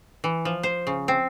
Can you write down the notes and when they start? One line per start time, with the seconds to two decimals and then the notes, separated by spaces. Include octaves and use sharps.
0.24 E3
0.45 F3
0.63 C5
0.87 C#3
1.08 C4